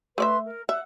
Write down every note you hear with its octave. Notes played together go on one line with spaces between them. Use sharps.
A3 B4 D5 E5 C6
A#4
E5 F#5 F#6